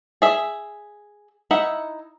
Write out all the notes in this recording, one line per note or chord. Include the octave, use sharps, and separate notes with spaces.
G#4 E5
D#4 E4 E5 F#5